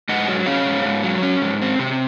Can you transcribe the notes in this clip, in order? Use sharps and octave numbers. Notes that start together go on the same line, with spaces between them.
G#2 D#5 F#5
F#3
C#4 C#5 F5
G#2
G#2
F#3
C#4
G#2
C4
C3